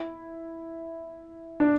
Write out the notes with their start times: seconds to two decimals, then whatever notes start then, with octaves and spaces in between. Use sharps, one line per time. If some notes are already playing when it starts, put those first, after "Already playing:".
Already playing: E4
1.60 D4